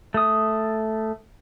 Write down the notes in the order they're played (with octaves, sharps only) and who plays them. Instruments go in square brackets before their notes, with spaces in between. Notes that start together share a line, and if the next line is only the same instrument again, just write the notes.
[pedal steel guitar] A3 D#6